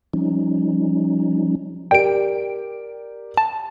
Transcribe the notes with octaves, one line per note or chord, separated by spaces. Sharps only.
F3 G3 C#4 D#4
G4 A#4 D5 G5 D7
A5